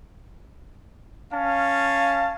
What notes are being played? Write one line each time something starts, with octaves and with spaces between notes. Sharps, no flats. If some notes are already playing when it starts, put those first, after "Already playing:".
C#4 F5 A5